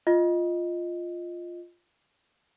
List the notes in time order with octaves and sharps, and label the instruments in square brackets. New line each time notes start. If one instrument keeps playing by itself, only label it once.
[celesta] F4 D#5